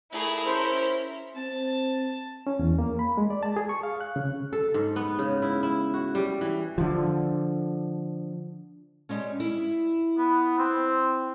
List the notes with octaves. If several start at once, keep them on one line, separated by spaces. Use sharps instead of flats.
A3 E4 G#4 A#4
C#4 C5
C4 A5
C#4
E2
A#3
B5
G#3
D5
A5
G#4
C#6
F5
F#6
C#3
A4
G#2
B3
C#3
E4
E4
F#4
G3
E3
D3 F3
G3 G#3 C#4
E4
B3
C4